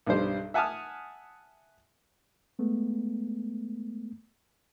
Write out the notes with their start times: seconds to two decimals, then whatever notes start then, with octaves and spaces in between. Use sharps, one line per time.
0.06 B1 G2 G3 C5
0.54 E5 F#5 G#5 A5 D#6 F6
2.59 G#3 A3 B3